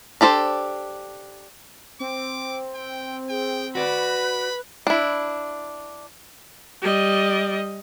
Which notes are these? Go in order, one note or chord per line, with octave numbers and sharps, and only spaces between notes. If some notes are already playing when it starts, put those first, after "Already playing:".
D4 G4 A4 C5
C4 D6
G5
G#4 G5
F#4 B4 D5 B5
D4 E4
G3 D#5